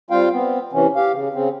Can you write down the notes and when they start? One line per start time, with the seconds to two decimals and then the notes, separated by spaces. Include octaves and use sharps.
0.10 G3 C4 F4 F5 G5
0.32 B3 C4
0.73 C3 E3 C#4
0.96 G4 F5
1.13 C#3
1.34 C#3 C4